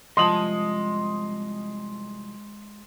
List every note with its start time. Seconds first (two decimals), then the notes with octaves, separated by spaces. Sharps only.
0.17 C2 F3 G#3 D#5 A5 C6 D#6 F#7